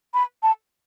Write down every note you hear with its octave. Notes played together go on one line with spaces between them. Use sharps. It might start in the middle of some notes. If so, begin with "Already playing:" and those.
B5
A5